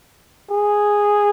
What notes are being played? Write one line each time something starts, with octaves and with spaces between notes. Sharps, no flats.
G#4